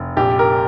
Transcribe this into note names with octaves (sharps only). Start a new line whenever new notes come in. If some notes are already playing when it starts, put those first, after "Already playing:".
Already playing: F1
A#1 G4
A#4